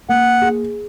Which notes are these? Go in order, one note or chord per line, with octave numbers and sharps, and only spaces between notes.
A#3 F#5
G#4